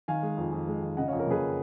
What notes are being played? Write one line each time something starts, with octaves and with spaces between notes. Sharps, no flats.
D#3 F5 G#5
G#3
F2
F2
G#3
D#3
C#3 D#5 F#5
C#5 F5
F2
A#4 C#5
F#1 G#4 B4